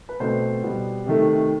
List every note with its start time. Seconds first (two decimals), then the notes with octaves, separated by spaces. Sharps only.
0.09 B4
0.20 B2 A3 C4 C5
0.63 B2 G3 B3
1.06 C3 D#3 A3